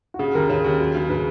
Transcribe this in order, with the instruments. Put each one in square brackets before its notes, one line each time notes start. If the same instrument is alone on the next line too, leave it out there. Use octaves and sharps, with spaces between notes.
[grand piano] F#4
[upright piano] C#3 [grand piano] G#4
[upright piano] D#2 [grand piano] A#4
[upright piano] C#3 [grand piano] C#5
[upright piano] D#2
F#3
C#3
[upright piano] C#3 [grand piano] B4